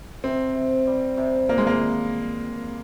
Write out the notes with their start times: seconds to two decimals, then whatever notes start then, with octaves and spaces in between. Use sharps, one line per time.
0.24 C3 C4
0.55 C3
0.87 G3
1.17 C3
1.49 A#2 A#3
1.58 G#3
1.67 A#3